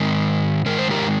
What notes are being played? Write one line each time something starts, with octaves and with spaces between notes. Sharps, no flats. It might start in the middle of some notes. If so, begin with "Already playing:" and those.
Already playing: G#2 D#3 G#3
G#2 D#3 G#3 A#4
C5
G4 A#4